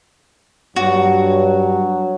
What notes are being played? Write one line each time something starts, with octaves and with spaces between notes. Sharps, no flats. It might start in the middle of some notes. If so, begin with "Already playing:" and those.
G2 F#3 F#4